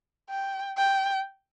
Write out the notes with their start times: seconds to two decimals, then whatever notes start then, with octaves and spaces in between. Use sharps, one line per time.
0.30 G5
0.77 G5